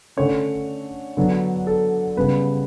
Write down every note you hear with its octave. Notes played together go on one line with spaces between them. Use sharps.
D3 A3 C#4 C#5
D3 F#3 B3
A4
C#3 G3 B3 B4